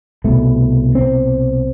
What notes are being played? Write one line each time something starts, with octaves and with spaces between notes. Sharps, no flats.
C2 B2 A3
C4